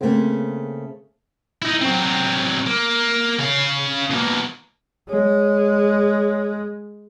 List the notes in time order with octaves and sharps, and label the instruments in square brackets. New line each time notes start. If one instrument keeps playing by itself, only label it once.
[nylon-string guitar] C#3 A3 A#3 C4 C5
[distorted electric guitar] D#4 E4
F#3 C4
A#3
C#3 F5
B2 A#3
[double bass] G#3 [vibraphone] C#5